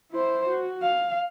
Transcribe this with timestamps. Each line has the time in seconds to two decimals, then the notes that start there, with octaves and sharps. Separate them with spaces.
0.11 E4 C5
0.48 F#4
0.82 F5